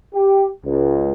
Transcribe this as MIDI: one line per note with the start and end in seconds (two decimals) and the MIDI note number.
0.14 0.47 67
0.64 1.12 37